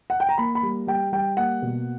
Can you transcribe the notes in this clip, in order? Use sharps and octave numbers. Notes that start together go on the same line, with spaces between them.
F#5
G5
A#5
A#3 B5
B5
G3
G3 G5
G3 G5
A#3 F#5
B2